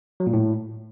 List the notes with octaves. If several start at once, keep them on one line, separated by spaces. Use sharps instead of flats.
F#3
A#2
A2